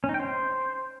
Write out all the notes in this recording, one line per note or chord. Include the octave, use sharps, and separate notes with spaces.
C#4
D#4
G5
C5